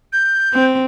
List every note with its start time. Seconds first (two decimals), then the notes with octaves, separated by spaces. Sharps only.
0.13 G6
0.53 C4